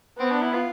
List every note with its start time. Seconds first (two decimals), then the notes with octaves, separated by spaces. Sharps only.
0.18 B3 C4
0.31 D4
0.42 E4
0.53 F4